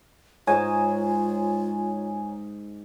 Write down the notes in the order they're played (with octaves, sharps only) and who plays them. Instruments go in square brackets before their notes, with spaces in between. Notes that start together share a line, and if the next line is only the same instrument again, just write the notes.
[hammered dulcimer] G#2 [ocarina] F4 [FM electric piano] C#5 G#5 A#5